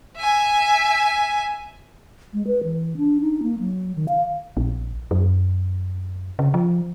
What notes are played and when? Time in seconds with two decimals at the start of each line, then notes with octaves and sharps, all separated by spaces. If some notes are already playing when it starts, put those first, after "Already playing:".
0.17 E5 G#5
2.33 G#3
2.47 B4
2.64 E3
2.97 D4
3.21 D#4
3.43 A#3
3.59 F#3
3.95 D#3
4.08 F5
4.57 A#1
5.11 F#2
6.39 C#3
6.54 F3